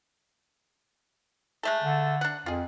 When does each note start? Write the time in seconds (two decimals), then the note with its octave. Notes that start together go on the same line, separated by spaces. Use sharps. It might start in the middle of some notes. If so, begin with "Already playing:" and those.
1.63 G#3 A3 A4
1.83 D3
2.21 D4 F#5
2.46 F2 F4 G#4